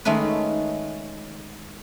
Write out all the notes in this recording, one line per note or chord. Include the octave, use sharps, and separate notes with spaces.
D#3 G#3 A3 C#4 B4